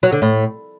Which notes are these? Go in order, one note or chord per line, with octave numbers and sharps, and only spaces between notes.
F#3
D3
A2